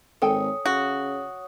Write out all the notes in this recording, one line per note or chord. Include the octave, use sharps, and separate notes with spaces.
G#1 A4 C#5 G5 G#5 D#6
C#3 F#4